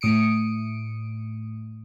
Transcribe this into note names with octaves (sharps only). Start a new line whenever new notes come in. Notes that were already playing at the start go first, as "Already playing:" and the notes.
A2 D#6 C#7 D7